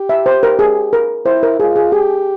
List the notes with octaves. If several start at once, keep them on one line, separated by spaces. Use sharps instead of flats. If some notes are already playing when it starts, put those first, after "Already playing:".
Already playing: G4
E5
C5
A#4
G#4
A#4
E4 C5
A#4
F4 G#4
G#4
G4 G#4